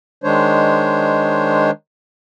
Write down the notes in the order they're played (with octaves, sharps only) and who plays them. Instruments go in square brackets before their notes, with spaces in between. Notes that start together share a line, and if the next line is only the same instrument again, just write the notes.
[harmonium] D#3 G#3 D4 C5 C#5